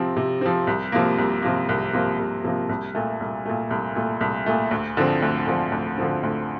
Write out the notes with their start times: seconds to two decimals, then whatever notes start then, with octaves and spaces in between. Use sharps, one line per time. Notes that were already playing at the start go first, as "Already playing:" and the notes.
Already playing: C3 F3 C4
0.17 C3
0.41 F3 C4
0.67 C2
0.92 C3 F3 A#3
1.18 C2
1.42 C3 F3 A#3
1.69 C2
1.93 C3 F3 A#3
2.19 C2
2.44 C3 F3 A#3
2.69 C2
2.95 A#2 A3
3.20 C2
3.45 A#2 A3
3.71 C2
3.95 A#2 A3
4.21 C2
4.46 A#2 A3
4.71 D2
4.97 D3 F3 C4
5.22 D2
5.47 D3 F3 C4
5.72 D2
5.98 D3 F3 C4
6.23 D2